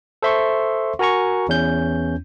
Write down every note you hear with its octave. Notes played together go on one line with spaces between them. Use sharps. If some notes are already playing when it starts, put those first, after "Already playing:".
A4 C5 E5 C6 C#6
F#4 A#4 G#5 A#5 C#6
E2 C#4 G6